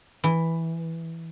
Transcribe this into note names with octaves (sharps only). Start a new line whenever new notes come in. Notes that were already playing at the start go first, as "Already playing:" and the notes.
E3